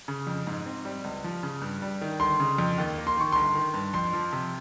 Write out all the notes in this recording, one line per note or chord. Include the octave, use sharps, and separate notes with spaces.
C#3
F2
G#2
C4
G3
C#2
F3
C#3
G2
G3
D#3
G1 C6
C#3
F2
D#2
A#3
C6
D#3 C#6
G1 C6
D#3
G2
F2 C6
F3
C3